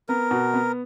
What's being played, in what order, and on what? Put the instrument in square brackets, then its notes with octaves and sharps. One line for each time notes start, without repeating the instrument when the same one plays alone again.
[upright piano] B3 [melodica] A#4
[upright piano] B2
B3